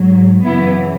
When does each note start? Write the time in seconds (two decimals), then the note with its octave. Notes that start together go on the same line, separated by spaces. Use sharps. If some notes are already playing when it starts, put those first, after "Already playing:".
Already playing: G#2 F#3
0.44 F#2 C#3 E3 B3 E4